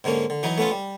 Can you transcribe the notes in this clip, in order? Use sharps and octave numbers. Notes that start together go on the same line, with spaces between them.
G#2 D3 A#3 C#4
D3
E3 F#3 D#4
A3 B3 C#4 F4
G3